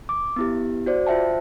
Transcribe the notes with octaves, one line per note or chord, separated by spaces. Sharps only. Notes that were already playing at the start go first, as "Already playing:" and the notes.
D6
B3 E4 G4
F#4 C5 D5
F4 C5 E5 G5 A5